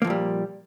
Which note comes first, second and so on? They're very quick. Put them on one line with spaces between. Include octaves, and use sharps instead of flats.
A#3 F3 A#2 G3